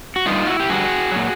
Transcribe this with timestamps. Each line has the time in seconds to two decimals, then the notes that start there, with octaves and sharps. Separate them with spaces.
0.16 F#4
0.26 G2 D3 G3 D#4 F4
0.47 E4 F#4
0.60 G4
0.70 G2 D3 G3 F#4 G#4
1.12 A#2 F#3